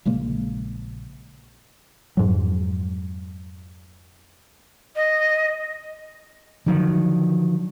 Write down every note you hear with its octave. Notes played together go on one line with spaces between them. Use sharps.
A#1 C#3 G#3 A#3
F2 G#2 F#3
D#5
D3 D#3 F3 F#3